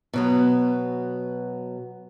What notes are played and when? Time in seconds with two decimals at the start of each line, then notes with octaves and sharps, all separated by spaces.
0.13 B2 F#3 B3